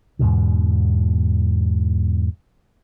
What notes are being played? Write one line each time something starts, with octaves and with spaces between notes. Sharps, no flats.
E2 G#2 B2 D3